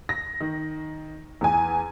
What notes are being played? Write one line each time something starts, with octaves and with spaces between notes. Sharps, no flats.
A#6
D#3
E2 G#5